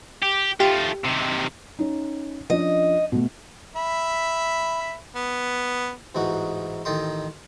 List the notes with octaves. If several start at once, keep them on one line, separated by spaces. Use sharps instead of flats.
G4
A3 F4 G4
C3 D#3
C#4 D#4
F3 C#4 D4 D#5
B2 A3
E5 B5
B3
A1 G#2 E3 D#4 F#4
A1 D#3 A4 D#5 G5 C6